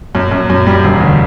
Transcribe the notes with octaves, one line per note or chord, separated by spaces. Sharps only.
F#2
F#2
F#2
G3
E1
D2